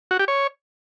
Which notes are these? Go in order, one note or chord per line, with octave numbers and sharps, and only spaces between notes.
F#4
G4
C#5